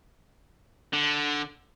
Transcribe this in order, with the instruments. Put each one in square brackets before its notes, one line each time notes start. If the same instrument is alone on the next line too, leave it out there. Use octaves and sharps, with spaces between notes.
[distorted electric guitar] D3